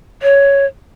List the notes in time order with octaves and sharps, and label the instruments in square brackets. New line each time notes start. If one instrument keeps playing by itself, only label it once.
[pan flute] C#5